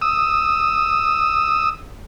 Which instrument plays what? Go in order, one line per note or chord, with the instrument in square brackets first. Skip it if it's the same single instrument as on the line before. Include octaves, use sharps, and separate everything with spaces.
[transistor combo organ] D#6 E6